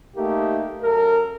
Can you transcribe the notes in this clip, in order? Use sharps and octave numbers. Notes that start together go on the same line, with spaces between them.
A3 A#3 D#4 G4
F#2 A4 A#4